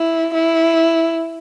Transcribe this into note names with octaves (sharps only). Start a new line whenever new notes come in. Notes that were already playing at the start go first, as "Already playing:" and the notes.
Already playing: E4
E4